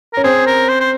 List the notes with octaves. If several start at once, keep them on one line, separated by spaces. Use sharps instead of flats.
C#4 A#4
C4 G#4
A#4
C5
C5